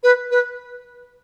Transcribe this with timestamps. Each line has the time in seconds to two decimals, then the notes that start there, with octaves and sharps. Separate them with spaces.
0.03 B4
0.31 B4